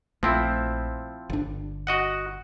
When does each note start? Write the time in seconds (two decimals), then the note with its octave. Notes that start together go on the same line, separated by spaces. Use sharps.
0.23 A#1 F3 A3 C4 E4
1.30 G1 D4
1.87 F#4 D#5 F#5